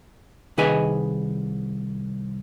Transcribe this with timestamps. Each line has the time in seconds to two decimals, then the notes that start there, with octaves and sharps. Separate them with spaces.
0.58 C2 D#3 G#4 B4 D#5 G#5